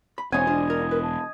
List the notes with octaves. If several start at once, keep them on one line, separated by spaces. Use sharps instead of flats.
B5
E1 C4 C#5 D#5 F5 G#5
D4 F4 G#4 C5
A#4
A#4 B4
A5